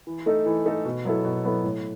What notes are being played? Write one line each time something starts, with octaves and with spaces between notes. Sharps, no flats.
E3
A3 D#4 A4
E3
A3 D#4 A4
B2
F#3 B3 E4 A4
B2
F#3 B3 E4 A4
A2